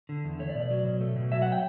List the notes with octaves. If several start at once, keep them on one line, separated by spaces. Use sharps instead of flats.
D3
E2
A3 C#5
D5
B2
D5
F#3
B2
A3
B2
F#3 E5
F#5
G5